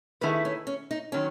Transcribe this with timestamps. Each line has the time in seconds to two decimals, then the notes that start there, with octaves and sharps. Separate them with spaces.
0.21 D#3 A3 B3 E4 G#4 B4
0.45 C#4
0.67 C#4
0.91 D#4
1.12 D#3 F#3 C#4